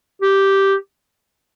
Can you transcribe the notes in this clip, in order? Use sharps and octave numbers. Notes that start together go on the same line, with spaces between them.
G4